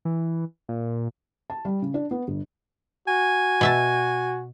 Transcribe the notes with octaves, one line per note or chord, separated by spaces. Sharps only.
E3
A#2
A5
G3
C#3
D4
B3
G1
F#4 G#5
B2 E5 A5